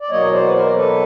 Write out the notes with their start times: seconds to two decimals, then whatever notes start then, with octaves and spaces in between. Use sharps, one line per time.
0.01 D5
0.10 E2 B2 F#3 A#3 C#5 D#5
0.32 C5 D5
0.47 B4
0.53 A#4 C5
0.75 A4 B4